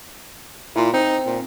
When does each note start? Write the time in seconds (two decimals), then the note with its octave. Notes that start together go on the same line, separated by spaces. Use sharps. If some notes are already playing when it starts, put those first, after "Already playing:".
0.76 A#2 E4 F4
0.94 C4 D#4
1.26 A#2